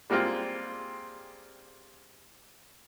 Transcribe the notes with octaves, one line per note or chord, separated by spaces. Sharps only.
G3 G#3 A#3 C4 F4